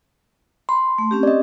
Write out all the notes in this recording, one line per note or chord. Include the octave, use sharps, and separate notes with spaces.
B5 C6
A3
C4 C#4 G4
D5 D#5